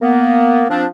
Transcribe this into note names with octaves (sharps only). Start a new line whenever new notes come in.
A#3 B3
F3 C4 D4